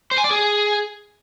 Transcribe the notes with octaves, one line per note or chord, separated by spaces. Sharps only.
C5
G#5
D5
G#4